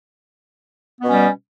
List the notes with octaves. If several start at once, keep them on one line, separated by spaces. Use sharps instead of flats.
B2 G3 B3 C#4